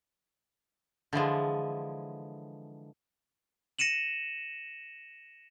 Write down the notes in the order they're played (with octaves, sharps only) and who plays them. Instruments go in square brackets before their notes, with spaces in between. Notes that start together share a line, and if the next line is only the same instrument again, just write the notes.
[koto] D3 E3 F3 G#3
[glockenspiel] A#6 C#7 D#7 E7 F#7